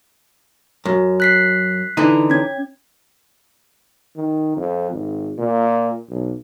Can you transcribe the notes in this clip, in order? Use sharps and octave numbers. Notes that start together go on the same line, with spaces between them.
F#2
F#6 B6 C7
D3 E3 D#4
C#4 G#6
D#3
F2
G#1
A#2
B1